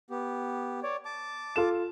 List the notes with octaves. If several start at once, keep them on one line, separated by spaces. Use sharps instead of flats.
B3 G4
C#5 D5
A5 D6
F4 A4 E7